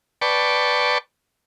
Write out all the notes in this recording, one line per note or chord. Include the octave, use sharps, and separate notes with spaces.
B4 D5 G5 A5 C#6